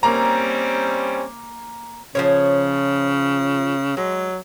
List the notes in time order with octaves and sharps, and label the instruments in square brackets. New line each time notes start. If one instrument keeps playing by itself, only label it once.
[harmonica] G3 C4 C#4 [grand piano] A#3 A#5
[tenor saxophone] C#3 [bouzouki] F3 C5 C#5
[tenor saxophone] F#3 [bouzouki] G#3